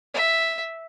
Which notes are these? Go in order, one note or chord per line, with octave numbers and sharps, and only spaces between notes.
E5